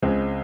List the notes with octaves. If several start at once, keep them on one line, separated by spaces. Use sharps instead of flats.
C#2 C#3 G#3 C4